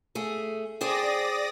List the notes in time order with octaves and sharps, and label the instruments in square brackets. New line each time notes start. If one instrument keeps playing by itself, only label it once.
[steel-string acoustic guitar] A3 G#4
[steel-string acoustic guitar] G#4 C5 G5 [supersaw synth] D5 D#6 A#6